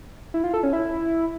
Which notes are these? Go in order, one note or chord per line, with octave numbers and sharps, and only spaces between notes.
E4
F4
A4
C#4
E4